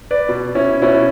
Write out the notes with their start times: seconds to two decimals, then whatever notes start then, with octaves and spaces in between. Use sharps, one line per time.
0.11 B4 D5
0.29 B2
0.55 C#4 E4
0.82 B2 C#4 E4